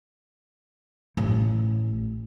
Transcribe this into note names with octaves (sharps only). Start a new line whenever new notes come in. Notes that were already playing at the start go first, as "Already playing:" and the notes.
A1